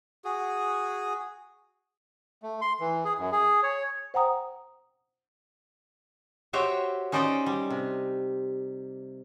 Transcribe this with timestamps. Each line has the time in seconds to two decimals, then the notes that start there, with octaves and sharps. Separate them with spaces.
0.24 F#4 G#4
2.43 A3
2.62 C6
2.80 E3
3.05 G#4
3.19 F#2
3.32 G#4
3.63 C#5
4.14 C5 F#5 G5 A#5 D#6
6.53 F#4 G4 C5 C#5 E5 G5
7.12 C#4 D#4 C5 D5 D#5 G5
7.46 G3
7.70 C3